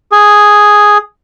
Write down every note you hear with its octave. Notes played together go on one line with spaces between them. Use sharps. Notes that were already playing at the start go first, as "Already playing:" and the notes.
G#4